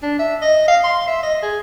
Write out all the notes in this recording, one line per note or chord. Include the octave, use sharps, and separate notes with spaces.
D4
E5
D#5
F5
C6
E5
D#5
G#4